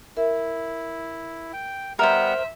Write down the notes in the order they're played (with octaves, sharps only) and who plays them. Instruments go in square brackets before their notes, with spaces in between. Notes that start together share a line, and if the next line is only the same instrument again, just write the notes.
[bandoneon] E4 [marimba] A#4 E5
[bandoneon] G5
[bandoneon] G3 B3 F#5 [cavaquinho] A#4 C5 [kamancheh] E5